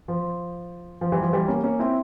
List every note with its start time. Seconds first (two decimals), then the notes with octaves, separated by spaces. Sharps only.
0.08 F3
1.01 F3
1.12 E3 G3
1.22 F3
1.33 E3 G3
1.48 A#3 C#4
1.64 A#3 C#4
1.79 C4 E4